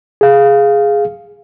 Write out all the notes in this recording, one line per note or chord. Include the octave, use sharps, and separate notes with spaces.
G#4 F5